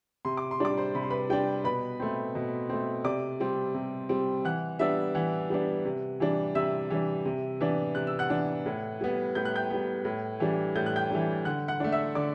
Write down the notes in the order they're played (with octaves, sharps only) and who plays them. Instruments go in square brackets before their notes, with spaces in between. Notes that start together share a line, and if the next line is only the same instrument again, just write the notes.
[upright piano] C3 C6
D6
C6
G3 D4 D6
C5 C6
C3 B5
C6
B4 B5
G3 D4 G5
B2 B4 B5
A3 C4
B2
A3 C4
C3 D5 D6
G3 C4
C3
G3 C4
E3 F#5 F#6
G3 B3 D4 E5 E6
E3 F#5
G3 B3 D4
C3
E3 G3 D4
C3 E5 E6
E3 G3 D4
C3
E3 B3 D4
C3 F#6
E6
F#5 F#6
E3 B3 D4
A2
G3 B3
A2 G6
F#6
G5 G6
G3 B3
A2
E3 G3 D4
A2 G6
F#6
G5 G6
E3 G3 D4
D3 F#5 F#6
F#5 F#6
A3 D4
E5 E6
D3 D5 D6